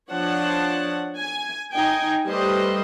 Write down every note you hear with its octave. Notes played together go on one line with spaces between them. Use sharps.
F3 D4 C#5 F#5 A5
G#5
D#4 G5 G#5
G3 A3 G4 B4 C5 D#5